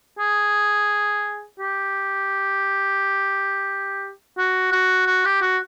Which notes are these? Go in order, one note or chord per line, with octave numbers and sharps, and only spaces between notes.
G#4
G4
F#4
F#4
F#4
G4
F#4